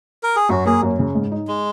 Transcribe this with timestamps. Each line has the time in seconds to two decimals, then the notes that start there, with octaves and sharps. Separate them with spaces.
0.23 A#4
0.36 G#4
0.49 F#2 F#4
0.66 A#3 G#4
0.82 F#2
0.99 C#3
1.15 G#2
1.32 D#4
1.48 G#3